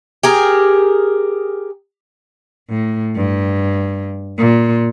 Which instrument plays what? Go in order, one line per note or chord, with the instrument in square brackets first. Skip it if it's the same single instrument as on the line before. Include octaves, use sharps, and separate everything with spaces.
[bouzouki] G4 G#4 A#4
[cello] A2
G2
A#2